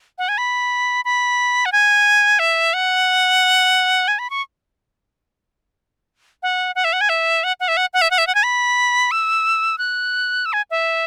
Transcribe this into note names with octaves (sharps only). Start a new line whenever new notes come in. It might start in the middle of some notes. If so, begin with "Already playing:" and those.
F#5
G#5
B5
B5
F#5
G#5
E5
F#5
G#5
B5
C#6
F#5
F#5
E5
F#5
G#5
E5
F#5
F#5
E5
F#5
F#5
E5
F#5
E5
F#5
G#5
B5
E6
F#6
E6
G#5
E5